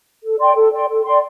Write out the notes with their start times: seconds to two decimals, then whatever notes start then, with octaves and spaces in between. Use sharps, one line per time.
0.24 A4
0.39 D5 G5 C6
0.55 A4
0.73 D5 G5 C6
0.88 A4
1.05 D5 G5 C6